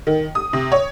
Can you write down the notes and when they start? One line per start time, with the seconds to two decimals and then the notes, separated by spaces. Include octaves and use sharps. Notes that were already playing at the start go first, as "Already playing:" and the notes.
0.07 D#3
0.35 D#6
0.53 C3
0.72 C#5